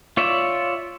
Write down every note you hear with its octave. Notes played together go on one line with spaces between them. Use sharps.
F4 C#5 D5 E5